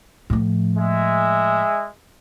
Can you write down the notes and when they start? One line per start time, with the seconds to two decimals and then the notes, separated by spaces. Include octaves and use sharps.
0.30 A2 F3
0.77 G#3 E5